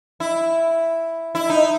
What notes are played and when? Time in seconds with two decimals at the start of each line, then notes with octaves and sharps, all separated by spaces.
0.20 E4
1.35 E4
1.50 D#4